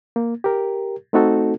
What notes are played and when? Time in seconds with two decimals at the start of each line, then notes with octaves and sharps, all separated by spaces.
0.16 A#3
0.44 G4 A#4
1.13 A3 C4 D#4 F#4 A4